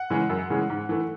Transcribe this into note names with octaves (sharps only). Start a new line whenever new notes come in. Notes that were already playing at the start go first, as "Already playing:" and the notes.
Already playing: F#5
C#3 E3 G#3
F#2
C#3 E3 G#3
G#2
E3 A3